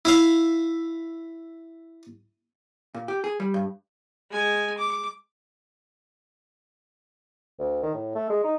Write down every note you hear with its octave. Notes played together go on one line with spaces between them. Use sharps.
E4 E5 F5
A#2
G4
G#4
G3
G2
G#3 G#5
D6
D2
D#3
A2
A3
G#3
D#4